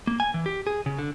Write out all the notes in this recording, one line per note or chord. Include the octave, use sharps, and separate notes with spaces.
A#3
G#5
E3
G4
G#4
C#3
D3